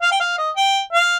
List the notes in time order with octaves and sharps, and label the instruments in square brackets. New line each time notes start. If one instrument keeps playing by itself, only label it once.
[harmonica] F5
G5
F5
D#5
G5
F5